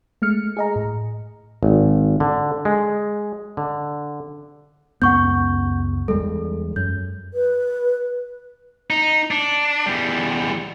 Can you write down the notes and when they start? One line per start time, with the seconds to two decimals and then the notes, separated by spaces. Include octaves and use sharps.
0.22 G#3 A3 F6 C#7
0.57 G#4 D#5 A#5
0.76 A2
1.63 G#1
2.20 D3
2.65 G#3
3.57 D3
5.02 C#2 F#2 B3 F#5 C#6 G6
6.08 E2 G3 G#3 A4
6.76 F#2 G6
7.34 B4
8.90 D#4
9.31 D4
9.86 E2 G3